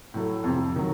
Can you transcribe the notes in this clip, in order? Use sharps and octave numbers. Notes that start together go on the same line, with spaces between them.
A2 F#3 A3
F2 C3 F3
D#3 F#3